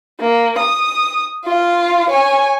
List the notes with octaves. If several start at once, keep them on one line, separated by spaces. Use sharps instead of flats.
A#3
D#6
F4 F5
C#5 G#5